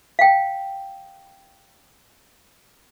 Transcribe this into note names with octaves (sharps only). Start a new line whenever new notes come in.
F5 G5